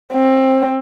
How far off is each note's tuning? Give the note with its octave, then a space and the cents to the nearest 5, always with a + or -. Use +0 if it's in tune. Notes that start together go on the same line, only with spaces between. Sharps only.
C4 +20